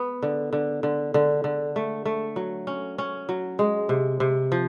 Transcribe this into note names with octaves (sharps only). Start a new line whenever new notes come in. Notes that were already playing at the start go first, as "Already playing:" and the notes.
Already playing: B3
D3
D3
D3
D3
D3
A3
A3
F#3
C#4
C#4
F#3
G#3
C3
C3
F3